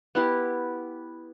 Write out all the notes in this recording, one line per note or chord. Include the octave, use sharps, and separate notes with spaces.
B3 E4 G4